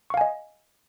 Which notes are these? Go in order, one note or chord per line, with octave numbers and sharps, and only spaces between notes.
D#5 F5 G#5 C#6